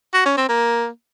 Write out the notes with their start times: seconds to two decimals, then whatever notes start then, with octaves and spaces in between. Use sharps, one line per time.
0.14 F#4
0.26 C#4
0.37 C4
0.49 A#3